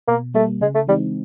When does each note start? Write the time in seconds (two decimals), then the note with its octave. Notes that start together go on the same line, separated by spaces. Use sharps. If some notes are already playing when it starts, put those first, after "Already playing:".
0.08 B2 A#3
0.34 G3 A3 A#3
0.61 C#3 G#3
0.75 A3
0.87 E3 G3 G#3 C4 D#4